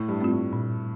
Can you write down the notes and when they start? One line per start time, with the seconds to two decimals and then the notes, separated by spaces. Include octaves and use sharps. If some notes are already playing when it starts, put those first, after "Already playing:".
Already playing: A2
0.08 G2
0.20 A3 C4 F4
0.31 A2
0.53 A#2